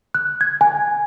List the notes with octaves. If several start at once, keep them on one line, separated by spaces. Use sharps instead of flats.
F#6
G#6
G#5